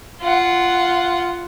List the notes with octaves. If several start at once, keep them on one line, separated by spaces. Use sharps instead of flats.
F4 F#5